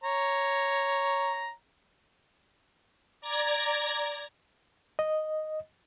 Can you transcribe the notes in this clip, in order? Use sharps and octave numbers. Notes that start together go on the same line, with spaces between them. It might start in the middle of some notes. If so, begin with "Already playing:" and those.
C#5 A#5
D5 A#5 G#6 A#6
D#5